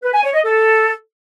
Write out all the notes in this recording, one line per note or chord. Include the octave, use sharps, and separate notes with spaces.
B4
G#5
C#5
D#5
A4